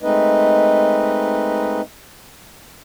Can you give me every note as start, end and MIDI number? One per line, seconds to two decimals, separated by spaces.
0.03 1.81 56
0.03 1.81 57
0.03 1.81 60
0.03 1.81 63
0.03 1.81 71
0.03 1.81 75